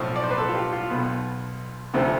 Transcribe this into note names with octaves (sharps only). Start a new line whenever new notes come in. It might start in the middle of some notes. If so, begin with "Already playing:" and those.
Already playing: B1 A2 F3 A4
D5
C5
B4
A4
F4
G4
F4
B1 B2 B3
D2 C3 F3 A3 C4 G4